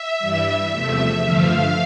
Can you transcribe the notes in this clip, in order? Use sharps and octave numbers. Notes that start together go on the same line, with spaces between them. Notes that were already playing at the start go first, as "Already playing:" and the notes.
Already playing: E5
G2 E3 G3
E2 C3 F3 A3 E5
G2 D3 F3 A3 F5